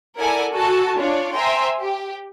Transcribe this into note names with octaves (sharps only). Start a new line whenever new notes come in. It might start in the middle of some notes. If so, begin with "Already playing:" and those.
E4 A4 A#4 D5 F#5 G#5
F#4 A4 G#5 A5
D4 F4 C#5 D5
C5 E5 G5 G#5 A#5 C6
G4